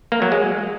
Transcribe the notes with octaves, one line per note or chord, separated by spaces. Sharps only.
A#3
F#3
G#3